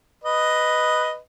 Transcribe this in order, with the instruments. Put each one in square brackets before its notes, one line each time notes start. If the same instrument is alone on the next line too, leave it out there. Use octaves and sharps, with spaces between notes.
[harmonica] B4 D#5